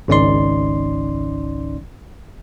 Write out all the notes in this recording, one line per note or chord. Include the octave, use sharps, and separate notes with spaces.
G#1 C#2 C#4 D#4 D5 C6